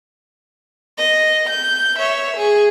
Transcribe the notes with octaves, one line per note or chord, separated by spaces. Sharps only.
D#5
G6
C#5 E5
G#4